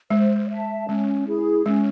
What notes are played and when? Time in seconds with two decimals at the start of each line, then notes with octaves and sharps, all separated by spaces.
0.10 G#3 C5
0.49 E5
0.54 A5
0.89 G#3 C#4
1.27 E4 G#4
1.66 G#3 C#4